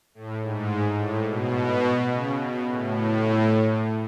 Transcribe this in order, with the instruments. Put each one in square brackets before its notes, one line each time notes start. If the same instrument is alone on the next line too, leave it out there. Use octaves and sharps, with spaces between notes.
[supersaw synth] A2
G#2
A2
B2
C#3
B2
A2